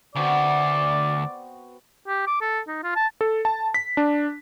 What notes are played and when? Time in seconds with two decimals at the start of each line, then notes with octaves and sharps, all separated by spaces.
0.15 D2 B3 C4 F#4 D5
2.08 G4
2.27 D6
2.41 A4
2.68 D#4
2.83 F4
2.96 A5
3.21 A4
3.45 A5
3.74 B6
3.97 D4